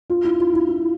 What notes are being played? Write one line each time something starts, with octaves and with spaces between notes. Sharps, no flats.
F4
E4
F4
E4
E4